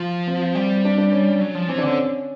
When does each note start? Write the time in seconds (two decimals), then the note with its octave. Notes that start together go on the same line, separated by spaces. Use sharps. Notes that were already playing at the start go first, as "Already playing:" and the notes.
Already playing: F3 F4
0.27 C4
0.55 G3
0.85 D4
0.98 D4
1.12 C#4
1.41 F#3
1.55 F3
1.69 E3 C4
1.78 D4
1.83 D3 C#4